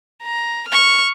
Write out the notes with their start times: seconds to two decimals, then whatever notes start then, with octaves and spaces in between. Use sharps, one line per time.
0.23 A#5
0.68 C#6 F6